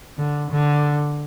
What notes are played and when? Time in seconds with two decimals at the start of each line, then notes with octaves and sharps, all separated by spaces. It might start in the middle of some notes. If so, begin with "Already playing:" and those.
0.18 D3
0.50 D3